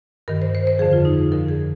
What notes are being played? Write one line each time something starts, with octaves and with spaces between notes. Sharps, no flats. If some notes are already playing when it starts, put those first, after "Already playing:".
G2 D#3 A#4
C5
C5
C5
F2 D3 F3 G#4
F4
D#4
F2 D3 F3 A#4
G#4